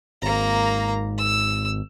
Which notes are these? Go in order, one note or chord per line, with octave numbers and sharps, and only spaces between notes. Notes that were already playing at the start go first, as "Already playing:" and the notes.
G#1 A#3 A#5
E6